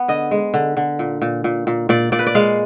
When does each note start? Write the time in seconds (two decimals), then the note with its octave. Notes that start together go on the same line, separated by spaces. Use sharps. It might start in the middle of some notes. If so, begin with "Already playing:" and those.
Already playing: B3
0.08 D3 D#5
0.31 G#3
0.54 D3
0.77 D3
0.99 A#2
1.22 A#2
1.44 A#2
1.67 A#2
1.89 A#2 D5
2.12 A#2 D5
2.19 B4
2.27 D5
2.35 G#3 F5